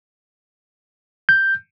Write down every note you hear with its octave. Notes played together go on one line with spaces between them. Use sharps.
G6